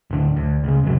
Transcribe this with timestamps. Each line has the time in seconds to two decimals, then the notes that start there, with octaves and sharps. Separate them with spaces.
0.11 D1 D3
0.37 D2
0.64 C#2 C#3
0.84 F1 A#1 C#3 F#3